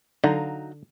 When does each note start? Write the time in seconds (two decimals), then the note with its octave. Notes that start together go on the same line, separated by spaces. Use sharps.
0.24 D3 F#3 D#4 F5